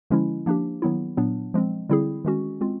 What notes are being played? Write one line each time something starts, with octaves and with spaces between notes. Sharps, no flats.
D3 F3 G#3 C#4 E4
F3 A#3 D4 G4
D#3 F#3 B3 E4
A#2 F#3 B3 D4
F3 G#3 C4
D3 G3 C4 E4 G#4
D#3 G#3 C#4 F#4
G#3 C4 F4